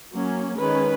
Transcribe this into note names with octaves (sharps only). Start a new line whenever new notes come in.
F#3 A#3 C#4
D#3 G#3 C#4 B4